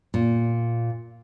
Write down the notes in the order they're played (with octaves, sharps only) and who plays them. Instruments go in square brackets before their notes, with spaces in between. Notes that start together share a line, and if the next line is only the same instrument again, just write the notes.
[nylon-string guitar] A#2